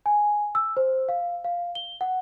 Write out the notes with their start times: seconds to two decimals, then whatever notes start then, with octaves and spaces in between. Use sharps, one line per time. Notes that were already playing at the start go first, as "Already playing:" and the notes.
0.06 G#5
0.55 E6
0.77 C5
1.09 F5
1.44 F5
1.75 G7
2.01 F#5